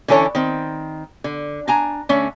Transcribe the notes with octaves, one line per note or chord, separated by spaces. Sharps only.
D3 E3 C#4 A4 C#5
D#3 C4
D3
D4 G#5 A#5
D3 A3 C#4